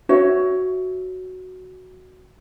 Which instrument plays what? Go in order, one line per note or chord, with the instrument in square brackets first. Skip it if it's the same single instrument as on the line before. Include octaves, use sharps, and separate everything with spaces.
[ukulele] F#4 C#5 E5